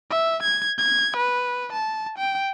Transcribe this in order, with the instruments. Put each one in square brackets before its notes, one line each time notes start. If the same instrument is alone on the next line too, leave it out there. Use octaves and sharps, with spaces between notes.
[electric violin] E5
G#6
G#6
B4
A5
G5